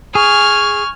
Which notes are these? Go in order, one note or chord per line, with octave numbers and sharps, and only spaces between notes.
G#4 G#5 C#6 F6